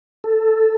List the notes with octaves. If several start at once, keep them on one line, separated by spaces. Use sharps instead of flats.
A4